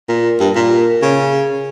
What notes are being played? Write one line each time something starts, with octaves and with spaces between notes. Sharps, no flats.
A#2
G2
A#2
C#3